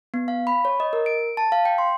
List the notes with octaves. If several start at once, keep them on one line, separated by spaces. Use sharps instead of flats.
B3
F5
B5
C#5
D#5
A#4
D7
A5
F5
G5
C6